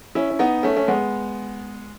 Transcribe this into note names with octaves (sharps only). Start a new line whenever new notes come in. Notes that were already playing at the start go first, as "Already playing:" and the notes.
C#4 E4
C#4
B3 D#4
A3 C#4
C#4
G#3 B3